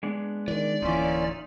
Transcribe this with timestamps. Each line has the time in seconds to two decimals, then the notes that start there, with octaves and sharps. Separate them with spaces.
0.03 G#3 B3 D4
0.48 D#3 E3 D5
0.82 D1 E3 A#3 C#4 D#4 F4 E5